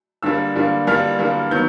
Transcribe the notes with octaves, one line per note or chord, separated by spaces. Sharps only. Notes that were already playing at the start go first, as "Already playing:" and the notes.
G2 D3 G3 A#3 E6
G2 D3 G3 A#3
G2 D3 G3 A#3 F6
G2 D3 G3 A#3
D#3 F#3 B3 G6